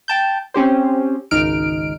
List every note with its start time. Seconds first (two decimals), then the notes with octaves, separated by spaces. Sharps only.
0.08 G5 A5 G6
0.54 C4 C#4 G4 C5
1.31 G#1 C#2 D#4 F6 D7